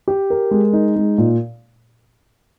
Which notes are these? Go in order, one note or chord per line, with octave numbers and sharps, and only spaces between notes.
G4
A#4
G#3
D#4
G#3
A#2